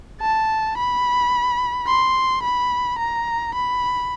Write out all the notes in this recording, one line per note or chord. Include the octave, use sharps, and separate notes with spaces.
A5
B5
C6
B5
A#5
B5